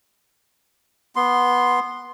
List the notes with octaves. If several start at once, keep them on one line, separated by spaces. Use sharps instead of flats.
B3 C6